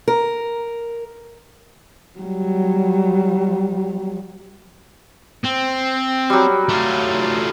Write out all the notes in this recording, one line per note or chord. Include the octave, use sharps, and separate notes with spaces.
A#4
F#3 G3
C4
F#3 G3
A3 F4